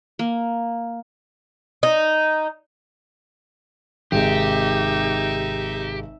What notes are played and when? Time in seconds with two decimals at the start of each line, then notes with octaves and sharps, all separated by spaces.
0.19 A#3
1.83 D#4
4.12 G#1 C3 G#3 D#4 G4 E5